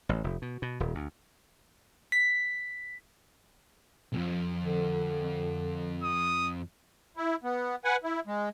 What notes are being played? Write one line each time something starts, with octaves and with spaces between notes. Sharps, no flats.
A1
F1
B2
B2
D#1
D2
B6
B1 F2
D3
D#6
E4
B3
B4 F#5 G#5
E4
G#3